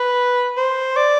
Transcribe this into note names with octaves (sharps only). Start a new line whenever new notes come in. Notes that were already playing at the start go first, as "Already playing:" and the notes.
Already playing: B4
C5
D5